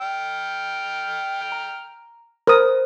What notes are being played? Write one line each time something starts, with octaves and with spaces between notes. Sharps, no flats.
G5 F6
A#5
A#4 C5 D#6